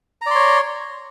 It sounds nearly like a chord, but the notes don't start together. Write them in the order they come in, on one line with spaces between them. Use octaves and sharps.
A#5 D5 C6 C#5